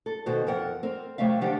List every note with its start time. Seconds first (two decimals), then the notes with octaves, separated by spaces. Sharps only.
0.06 A4
0.26 B2 D#3 F#4 C5
0.47 F2 A#4 F#5
0.83 C4 A#4
1.18 C3 F#3 A3 E5 F5
1.41 D#3 F3 D4 G4 F#5